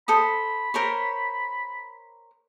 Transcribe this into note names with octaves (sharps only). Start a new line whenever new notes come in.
A4 C5 B5 D#6
A#4 C5 C#5